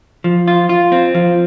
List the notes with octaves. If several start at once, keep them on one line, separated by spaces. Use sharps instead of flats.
F3
F4
F4
C4
F3